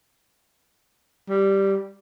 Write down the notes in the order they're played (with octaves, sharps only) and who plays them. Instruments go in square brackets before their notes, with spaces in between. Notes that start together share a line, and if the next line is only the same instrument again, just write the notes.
[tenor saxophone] G3